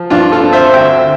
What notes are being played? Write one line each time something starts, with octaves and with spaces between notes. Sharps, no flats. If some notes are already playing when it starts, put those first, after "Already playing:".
Already playing: F3
G2 D4 F4
F4 A4
C4
C5 E5
D2 E5 G5